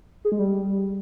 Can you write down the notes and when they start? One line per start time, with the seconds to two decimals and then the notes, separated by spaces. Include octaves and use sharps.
0.25 G#4
0.32 G#3
0.39 G3